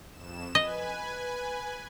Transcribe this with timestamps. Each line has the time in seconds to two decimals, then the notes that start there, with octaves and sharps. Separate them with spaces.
0.12 F2 E7
0.55 B4 D#5 G#5